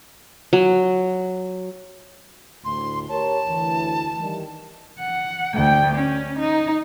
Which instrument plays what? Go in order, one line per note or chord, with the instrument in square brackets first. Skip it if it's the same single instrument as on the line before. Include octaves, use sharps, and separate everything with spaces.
[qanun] F#3
[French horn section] D2 A2 [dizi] C6
[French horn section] G4 A#4 C#5 [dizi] A5
[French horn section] D2 E3
D#3 E3 G3
[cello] F#5
D2 G5
C#4
D#4